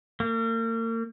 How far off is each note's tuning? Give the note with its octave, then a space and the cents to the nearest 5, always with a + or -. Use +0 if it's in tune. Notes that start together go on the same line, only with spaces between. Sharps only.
A#3 -40